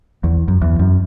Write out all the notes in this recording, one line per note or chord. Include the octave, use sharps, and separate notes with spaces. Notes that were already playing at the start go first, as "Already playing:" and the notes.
E2
F#2
E2
F#2